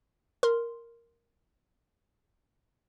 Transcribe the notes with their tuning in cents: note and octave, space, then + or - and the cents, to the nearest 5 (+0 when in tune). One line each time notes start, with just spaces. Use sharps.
A#4 +0 C6 +0